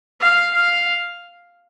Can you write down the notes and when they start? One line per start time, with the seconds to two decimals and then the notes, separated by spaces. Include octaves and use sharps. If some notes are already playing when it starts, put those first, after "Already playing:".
0.21 F5
0.54 F5